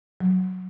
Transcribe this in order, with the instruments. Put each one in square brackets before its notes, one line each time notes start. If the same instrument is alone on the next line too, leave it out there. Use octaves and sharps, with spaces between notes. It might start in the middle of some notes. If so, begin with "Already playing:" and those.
[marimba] F#3